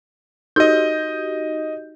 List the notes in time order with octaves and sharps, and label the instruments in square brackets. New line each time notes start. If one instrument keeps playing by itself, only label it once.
[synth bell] D#4 F#4 G4 [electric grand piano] D#5 G6